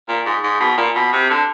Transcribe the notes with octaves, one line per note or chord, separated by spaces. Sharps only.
A#2
G#2
G#2
B2
A#2
B2
C3
D3